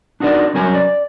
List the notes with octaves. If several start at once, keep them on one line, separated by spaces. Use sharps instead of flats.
D4 D#4 F#4 A#4 D5
C2 F#3 C#4 A#4 G#5
D5